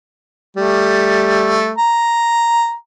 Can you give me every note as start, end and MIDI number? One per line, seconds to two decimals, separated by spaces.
0.57 1.71 55
0.57 1.71 57
1.78 2.73 82